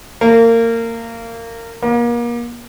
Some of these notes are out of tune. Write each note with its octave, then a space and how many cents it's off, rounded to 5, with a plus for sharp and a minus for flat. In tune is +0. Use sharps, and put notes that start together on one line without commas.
A#3 -25
A#3 +35